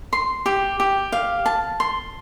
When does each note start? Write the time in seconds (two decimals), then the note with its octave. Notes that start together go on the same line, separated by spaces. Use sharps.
0.13 C6
0.46 G4
0.80 G4
1.12 F5
1.46 A5
1.80 C6